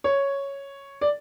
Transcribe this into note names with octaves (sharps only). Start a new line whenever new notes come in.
C#5
D5